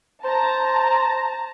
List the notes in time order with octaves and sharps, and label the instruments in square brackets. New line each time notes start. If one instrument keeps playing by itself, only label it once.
[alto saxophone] C5 [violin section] A5 A#5